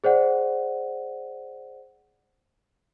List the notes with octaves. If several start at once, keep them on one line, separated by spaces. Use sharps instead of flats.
G#4 C5 D5 F#5